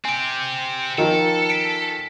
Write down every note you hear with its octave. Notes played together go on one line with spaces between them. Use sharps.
C4 G4 G#5 D7
D#3 F3 A4
B6 D7